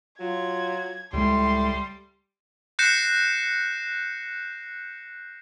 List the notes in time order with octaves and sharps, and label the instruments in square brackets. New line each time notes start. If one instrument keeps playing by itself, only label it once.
[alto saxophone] F#3 [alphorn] F4 [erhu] G#6
[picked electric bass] C#2 G#3 [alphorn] A2 [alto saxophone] G3 [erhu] C6
[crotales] F#6 G6 A#6 C7 C#7 E7